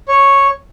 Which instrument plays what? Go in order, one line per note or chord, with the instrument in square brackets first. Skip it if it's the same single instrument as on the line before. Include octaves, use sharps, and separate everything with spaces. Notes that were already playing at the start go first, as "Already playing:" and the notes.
[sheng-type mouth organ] C#5